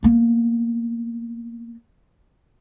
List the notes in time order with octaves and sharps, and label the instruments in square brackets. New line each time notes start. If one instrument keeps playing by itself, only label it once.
[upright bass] A#3 B3